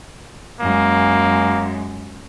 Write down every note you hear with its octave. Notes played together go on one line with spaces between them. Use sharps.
F#2 G#3 A#3